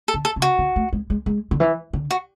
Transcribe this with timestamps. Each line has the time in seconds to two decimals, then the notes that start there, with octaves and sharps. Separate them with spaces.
0.08 A4
0.14 D3
0.25 A4
0.36 C#3
0.42 F#4
0.59 D3
0.76 A3
0.93 G#3
1.10 G#3
1.26 G#3
1.51 D3
1.60 E3
1.93 D3
2.11 F#4